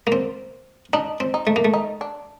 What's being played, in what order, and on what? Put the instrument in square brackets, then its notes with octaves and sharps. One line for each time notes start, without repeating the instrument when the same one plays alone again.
[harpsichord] A#3
C4
[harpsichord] D4 [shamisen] D#4
[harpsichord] C4
[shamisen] D#4
[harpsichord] A3
A#3
A3
[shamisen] D#4
D4